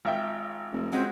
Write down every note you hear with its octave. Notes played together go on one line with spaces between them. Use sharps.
G#1 F4 E5 G5
F1
C#2 G#3 C4 F#4 B4